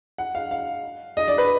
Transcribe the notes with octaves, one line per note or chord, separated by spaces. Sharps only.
F#5
F5
F5
D#5
D5
B4